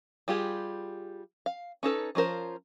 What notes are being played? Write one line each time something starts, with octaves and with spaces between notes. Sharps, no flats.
G3 F4 G4 G#4
F5
C#4 D#4 A4 B4
F3 C#4 F4 A#4 C5